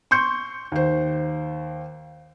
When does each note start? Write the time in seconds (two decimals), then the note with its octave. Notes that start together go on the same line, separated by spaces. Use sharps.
0.11 C6 C#6 G6 C#7
0.72 D#2 C5